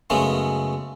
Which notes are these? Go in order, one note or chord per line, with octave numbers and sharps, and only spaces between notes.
F#2 C#3 G#3 A3 B3 C#4